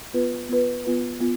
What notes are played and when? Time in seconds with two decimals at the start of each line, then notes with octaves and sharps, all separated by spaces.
0.14 B3 F4 B4
0.49 B3 F4 B4
0.85 B3 F4 B4
1.20 B3 F4